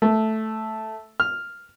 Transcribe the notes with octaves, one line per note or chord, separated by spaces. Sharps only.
A3
F6